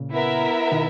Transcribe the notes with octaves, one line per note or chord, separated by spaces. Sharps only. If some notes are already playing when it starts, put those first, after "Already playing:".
Already playing: A#2 C#3
B3 E4 A#4 E5
B2 D#3